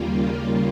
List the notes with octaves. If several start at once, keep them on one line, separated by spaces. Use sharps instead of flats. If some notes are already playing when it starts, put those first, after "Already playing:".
Already playing: D#2 C#3 G3 A#3 F4